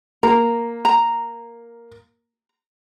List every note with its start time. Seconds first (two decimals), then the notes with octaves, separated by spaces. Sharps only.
0.23 A#3 A#5
0.85 A#5